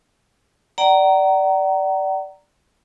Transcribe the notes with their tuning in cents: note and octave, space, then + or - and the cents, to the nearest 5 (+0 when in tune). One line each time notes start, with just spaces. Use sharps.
D5 +0 F#5 +45 A#5 +0